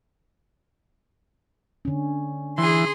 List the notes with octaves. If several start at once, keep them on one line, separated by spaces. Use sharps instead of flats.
D3 C#4
E3 G#4 C6